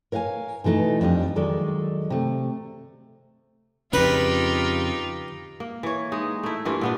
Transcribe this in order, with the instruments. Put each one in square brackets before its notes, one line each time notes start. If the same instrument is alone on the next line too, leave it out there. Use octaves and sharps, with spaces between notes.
[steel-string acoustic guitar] A#4 C#5 F5 F#5 G#5
B2 E3 A3 D#4
F2 G3 D4 D#5
D#3 F#3 G#3 A4 D5
C3 A3
[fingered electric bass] F2 C#3 [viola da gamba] D#4 F4 G4 [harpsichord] B4
[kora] A#3
E3 C#5
G#3 D#4
A3 E4
G2 E3 A#3 F4
A#2 B3 D4